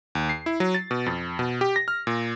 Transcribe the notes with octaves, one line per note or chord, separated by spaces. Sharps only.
D#2
C7
E4
F#3
A6
B2
F2
B2
G4
A#6
F6
A#2